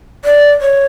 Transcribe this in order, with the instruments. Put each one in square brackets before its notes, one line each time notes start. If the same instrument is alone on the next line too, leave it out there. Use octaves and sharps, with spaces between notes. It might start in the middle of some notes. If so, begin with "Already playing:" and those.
[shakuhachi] D5
C#5